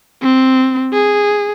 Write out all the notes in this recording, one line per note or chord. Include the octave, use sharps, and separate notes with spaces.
C4
G#4